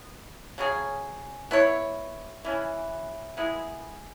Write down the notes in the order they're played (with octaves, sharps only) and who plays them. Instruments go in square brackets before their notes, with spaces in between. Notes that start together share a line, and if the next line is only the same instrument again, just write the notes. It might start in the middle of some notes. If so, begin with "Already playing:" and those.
Already playing: [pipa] B3
C#3 F#3 C#4 G#4
B3 E4 C#5
E3 C#4 E4
G#3 B3 E4 G#4